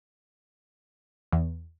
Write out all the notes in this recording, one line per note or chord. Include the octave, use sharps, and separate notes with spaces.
E2